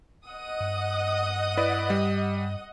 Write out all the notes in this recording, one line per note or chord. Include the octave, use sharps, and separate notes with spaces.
D#5 F#5 D#6
G2
E4 B4 D5
G3